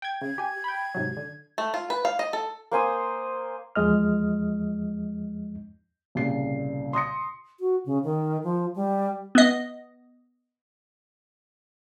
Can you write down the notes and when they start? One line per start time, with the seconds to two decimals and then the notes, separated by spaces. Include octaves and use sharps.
0.02 G5 G#6
0.21 C#3 G#6
0.38 G4 G#5
0.64 G5 B5
0.95 G#2 C3 F#3
1.17 D3
1.58 A3
1.74 F4
1.90 B4
2.05 F5
2.19 D#5
2.33 A4
2.71 A#3 C5 G#5 D#6
3.76 E2 F3 G#3 D#5 F6
6.15 C2 A#2 C#3 C7
6.93 C6 D#6 A#6 C#7
7.60 F#4
7.86 C#3
8.04 D#3
8.43 F3
8.76 G3
9.35 B3 D#5